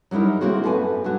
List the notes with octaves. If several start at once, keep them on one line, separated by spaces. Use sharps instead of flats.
F#3 G3 D#4 E4 A#4
G#3 A#3 C4 F#4 G#4
F#2 A4 B4 G#5
G2 F#3 F#4